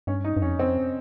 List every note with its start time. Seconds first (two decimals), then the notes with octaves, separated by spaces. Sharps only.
0.07 G2 C#4
0.24 D#4
0.37 G2
0.42 F2 C#4
0.59 C4